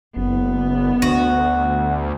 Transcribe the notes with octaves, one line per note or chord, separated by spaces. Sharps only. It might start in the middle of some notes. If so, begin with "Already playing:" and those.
F#1 B3
D2 F#4